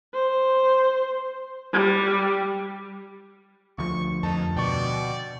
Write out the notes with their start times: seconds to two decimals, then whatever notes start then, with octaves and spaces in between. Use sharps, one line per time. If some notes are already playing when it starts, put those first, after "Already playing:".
0.14 C5
1.73 G3
3.78 D2 F3 C#6
4.23 F2 D#4 A5
4.57 B2 D5 G5 C#6